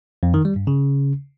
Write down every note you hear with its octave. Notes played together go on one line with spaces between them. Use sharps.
F2
D#3
G3
G2
C#3